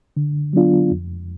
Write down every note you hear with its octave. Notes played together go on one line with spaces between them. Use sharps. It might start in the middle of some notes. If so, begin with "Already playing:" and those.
D3
F#3 B3 D4 F4
F2